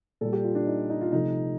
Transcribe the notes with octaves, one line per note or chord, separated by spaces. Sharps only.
A#2 G3 A4
G4
F4
D4
D#4
D#4
F4
C3 F3 A3 D#4